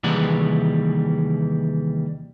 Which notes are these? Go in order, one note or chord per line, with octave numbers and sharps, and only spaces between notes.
D#2 C3 E3 G3 G#3 F#5